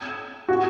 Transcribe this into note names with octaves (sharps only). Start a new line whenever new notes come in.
F#4